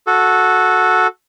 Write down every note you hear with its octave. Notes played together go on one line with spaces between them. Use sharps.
F#4 A4